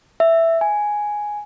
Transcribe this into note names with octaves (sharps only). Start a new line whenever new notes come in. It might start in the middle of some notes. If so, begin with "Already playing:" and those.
E5
G#5